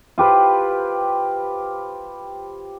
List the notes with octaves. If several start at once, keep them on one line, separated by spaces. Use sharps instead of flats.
F4 G4 B4 C5